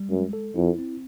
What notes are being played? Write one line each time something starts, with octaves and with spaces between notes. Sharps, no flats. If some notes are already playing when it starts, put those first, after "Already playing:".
Already playing: G3
F#2 G#3
A4
F2 E4
C4